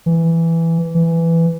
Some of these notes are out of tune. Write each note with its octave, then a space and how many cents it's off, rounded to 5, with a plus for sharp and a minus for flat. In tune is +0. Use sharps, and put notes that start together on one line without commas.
E3 +5
E3 +10